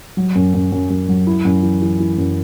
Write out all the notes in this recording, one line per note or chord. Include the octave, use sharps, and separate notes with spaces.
F#3
F#2
F#2
F#2
F#2
F#3
E4
F#2
E3
E3
E3
F#2